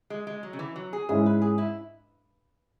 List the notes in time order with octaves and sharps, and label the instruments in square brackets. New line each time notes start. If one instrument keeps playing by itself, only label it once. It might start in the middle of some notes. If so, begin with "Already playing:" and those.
[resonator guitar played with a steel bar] G#3
G#3
F#3
C#3
E3
F#3
G#4
[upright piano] G#2 G#3 C#4 E4 [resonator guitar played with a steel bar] G#4
[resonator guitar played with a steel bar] B4
G#4
E4